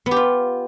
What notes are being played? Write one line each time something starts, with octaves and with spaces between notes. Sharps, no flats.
B3
G4
F4